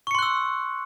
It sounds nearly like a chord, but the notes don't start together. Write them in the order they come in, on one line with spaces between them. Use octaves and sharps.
C#6 C#7 C6 F#6 E6